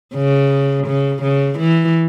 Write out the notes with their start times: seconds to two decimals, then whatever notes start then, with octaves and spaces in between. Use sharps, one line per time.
0.14 C#3
0.87 C#3
1.22 C#3
1.59 E3